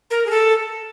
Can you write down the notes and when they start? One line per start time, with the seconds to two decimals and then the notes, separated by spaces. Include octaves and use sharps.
0.10 A#4
0.26 G#4
0.30 A4